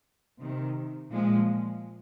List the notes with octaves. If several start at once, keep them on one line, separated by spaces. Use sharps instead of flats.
C3 D#3
A#2 F3 G#3